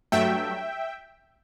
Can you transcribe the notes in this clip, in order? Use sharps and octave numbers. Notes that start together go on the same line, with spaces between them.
G2 F#3 A3 E5 G5